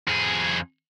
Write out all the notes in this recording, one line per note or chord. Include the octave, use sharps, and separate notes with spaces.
F2 G#4